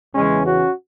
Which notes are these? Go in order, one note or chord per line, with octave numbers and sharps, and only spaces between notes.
E2 C#3 E3 G#3 C#4
C#4 F#4